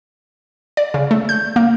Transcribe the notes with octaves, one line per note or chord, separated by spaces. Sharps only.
D5
C#3
A3
G6
A#3